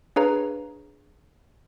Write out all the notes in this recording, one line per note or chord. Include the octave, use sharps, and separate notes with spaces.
D4 G#4 B4 C#5 F5 A#5